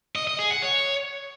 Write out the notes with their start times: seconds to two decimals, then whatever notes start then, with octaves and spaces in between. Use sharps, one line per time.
0.16 D#5
0.27 D#5
0.39 G#4
0.51 F#5
0.62 C#5